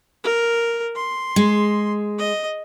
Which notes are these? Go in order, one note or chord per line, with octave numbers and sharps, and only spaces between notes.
A#4
C6
G#3
D#5